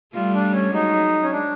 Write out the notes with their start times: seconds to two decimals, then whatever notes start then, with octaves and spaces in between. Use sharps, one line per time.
0.14 G3 A3 F4
0.34 D4
0.53 C#4
0.73 F#3 G#3 D#4
1.23 C#4
1.32 D4